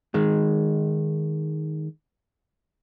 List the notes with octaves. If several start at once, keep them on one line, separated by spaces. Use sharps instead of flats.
D#3 G#3